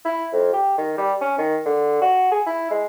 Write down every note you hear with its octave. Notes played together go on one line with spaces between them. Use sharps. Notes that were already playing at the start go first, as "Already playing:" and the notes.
E4
F2
G4
D#3
G3
C#4
D#3
D3
F#4
G#4
E4
G#3